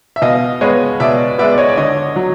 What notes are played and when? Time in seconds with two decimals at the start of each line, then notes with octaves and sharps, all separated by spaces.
0.16 E5
0.22 B2 D#5 F5
0.61 G#3 B3 C#5 D#5
1.00 B2 D5 E5
1.38 G#3 B3 D5 E5
1.52 D5
1.58 C#5 D#5
1.68 D5
1.77 D3 C#5 D#5
2.16 F#3